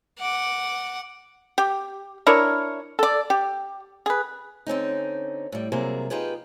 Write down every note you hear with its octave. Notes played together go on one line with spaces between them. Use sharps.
F#5 D6
G4
D4 E4 A#4 C#5
A4 D5
G4
G#4 B4
D3 C4 C#4 D#4
A2 G3
C3 F#3 G3 A#3 G#4
D#4 F4 G4 G#4 B4